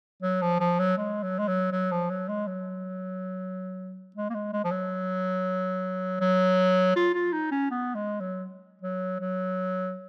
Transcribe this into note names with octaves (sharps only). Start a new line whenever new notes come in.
F#3
F3
F3
F#3
G#3
F#3
G#3
F#3
F#3
F3
F#3
G#3
F#3
G#3
A#3
G#3
G#3
F3
F#3
F#3
F4
F4
D#4
C#4
B3
G#3
F#3
F#3
F#3